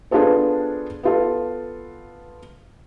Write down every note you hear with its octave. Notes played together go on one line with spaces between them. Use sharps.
B3 D4 F4 G#4 A4 C5
B3 F4 A4